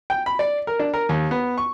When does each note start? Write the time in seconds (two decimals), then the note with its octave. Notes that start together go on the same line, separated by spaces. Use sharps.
0.10 G5
0.26 B5
0.39 D5
0.67 A#4
0.79 D4
0.94 A#4
1.09 D#2
1.31 B3
1.58 C#6